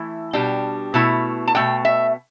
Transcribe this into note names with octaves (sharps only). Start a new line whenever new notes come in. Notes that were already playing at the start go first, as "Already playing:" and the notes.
Already playing: E3 A3 E4
B2 G3 D4 G5
B2 A3 E4
A5
B2 A3 D4 G5
E5